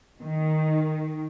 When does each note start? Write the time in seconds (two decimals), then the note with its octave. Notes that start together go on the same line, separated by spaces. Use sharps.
0.21 D#3